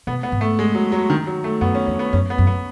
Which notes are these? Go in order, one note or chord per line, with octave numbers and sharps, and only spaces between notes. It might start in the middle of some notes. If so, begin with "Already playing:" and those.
B2 B3
B3
G#2
A3
G#3
F#3
F#3
D#3
F#3
A3
F#2 B3
C#4
E2 C#4
B3
F#2 C#4
B3
F#2
B3